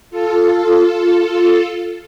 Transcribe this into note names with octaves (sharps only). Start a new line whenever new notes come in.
F4 A4